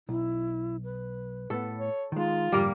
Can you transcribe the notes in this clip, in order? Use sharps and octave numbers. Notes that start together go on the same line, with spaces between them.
B1 E4
B4
A2 B3 A4
C#5
D#3 G#3 D#4 F4
F2 G#2 D3 G3 A#3 A#4